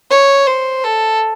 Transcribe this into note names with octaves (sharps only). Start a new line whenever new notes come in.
C#5
C5
A4